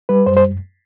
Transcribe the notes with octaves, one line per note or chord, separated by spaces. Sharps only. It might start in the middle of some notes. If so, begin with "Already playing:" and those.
G3 B4
F#2 C5
C5